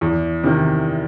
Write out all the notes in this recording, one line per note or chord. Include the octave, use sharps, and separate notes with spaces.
E2
C3 D#3